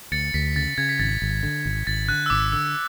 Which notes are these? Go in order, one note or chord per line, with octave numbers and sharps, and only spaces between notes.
D2 A6 C#7
D2 B6
C#3 A6
C#3 G#6
B6
G#1 A6
G#1
D3
G#1
G#1 A6
D3 F#6
E6
G#1 D6
D3 E6